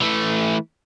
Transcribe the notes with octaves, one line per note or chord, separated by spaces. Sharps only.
E3 A3